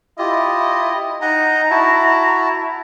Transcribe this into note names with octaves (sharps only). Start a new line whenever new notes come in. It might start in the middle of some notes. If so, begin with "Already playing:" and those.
E4 F4 G4 D#5
D#4 D#5 F#5 G#5 A#5
E4 F#4 A5